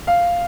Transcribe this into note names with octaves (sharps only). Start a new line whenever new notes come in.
F5